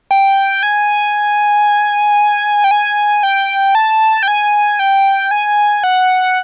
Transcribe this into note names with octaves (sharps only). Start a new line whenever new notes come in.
G5
G#5
G5
G#5
G5
A5
G5
G#5
G5
G#5
F#5